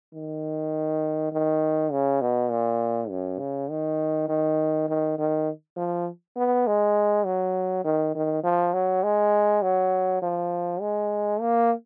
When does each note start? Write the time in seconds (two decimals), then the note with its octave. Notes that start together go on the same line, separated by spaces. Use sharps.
0.13 D#3
1.32 D#3
1.91 C#3
2.21 B2
2.51 A#2
3.10 F#2
3.39 C#3
3.70 D#3
4.29 D#3
4.88 D#3
5.18 D#3
5.77 F3
6.37 B3
6.67 G#3
7.25 F#3
7.84 D#3
8.15 D#3
8.44 F3
8.73 F#3
9.03 G#3
9.62 F#3
10.22 F3
10.81 G#3
11.40 A#3